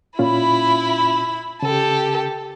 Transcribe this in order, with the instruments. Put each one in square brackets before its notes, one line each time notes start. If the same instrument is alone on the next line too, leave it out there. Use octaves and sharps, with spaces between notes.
[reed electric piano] A#2 C#4 F4 [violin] E4 B5
[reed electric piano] C#3 [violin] G4 A4